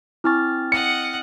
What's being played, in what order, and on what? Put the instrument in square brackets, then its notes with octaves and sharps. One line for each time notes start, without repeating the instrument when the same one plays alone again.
[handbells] C4 F6 A6 [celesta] E4 G#5 C#6
[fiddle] D#5 F#5 [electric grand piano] C#7